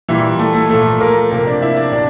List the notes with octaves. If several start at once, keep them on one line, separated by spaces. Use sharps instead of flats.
A#2 E3 G3 E4
A3 A4
A3 A4
A#2 F3 A3 A4
A#3 A#4
C3 F3 A#3 A#4
D4 D5
E4 E5
D4 D5
C3 D4 D5